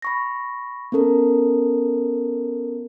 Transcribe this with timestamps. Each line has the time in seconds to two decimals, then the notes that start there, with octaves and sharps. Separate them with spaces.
0.02 B5 C#6 A#6
0.92 B3 C#4 A4 A#4